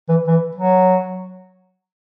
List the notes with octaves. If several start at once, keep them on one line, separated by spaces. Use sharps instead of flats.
E3
E3
F#3